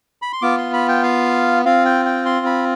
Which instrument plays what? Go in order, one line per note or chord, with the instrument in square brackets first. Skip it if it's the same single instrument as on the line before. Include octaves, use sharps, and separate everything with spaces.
[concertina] B5
C6
B3 F4 D6
C6
B5
G5
F5
C4 F4 F5
G5
G5
C6
B5